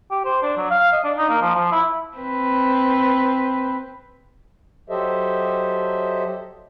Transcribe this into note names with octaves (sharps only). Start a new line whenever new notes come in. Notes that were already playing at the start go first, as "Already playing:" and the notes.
G4
C5
D4
F#3
F5
D#5
D4
D#4
A#3
F3
F3
E4
C4 B4
F#3 G4 A4 C5 D#5 E5